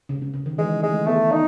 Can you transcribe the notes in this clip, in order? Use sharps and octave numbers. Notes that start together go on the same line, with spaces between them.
C#3
C#3
C#3
D#3
E3 G#3
G#3 A3
A3 B3
D#4